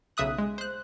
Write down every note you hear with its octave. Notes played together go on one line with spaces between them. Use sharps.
B1 C#3 E5 D#6 F#6
G#3
C5 F#6